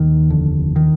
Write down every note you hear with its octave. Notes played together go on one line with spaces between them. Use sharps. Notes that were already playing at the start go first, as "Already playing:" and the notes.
Already playing: D#2 D#3
F1 D3
D#3